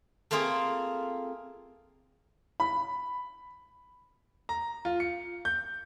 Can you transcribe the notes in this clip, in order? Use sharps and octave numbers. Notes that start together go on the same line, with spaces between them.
A3 A#3 C4 F4 G#4
B5
A#5
F4
C#7
G6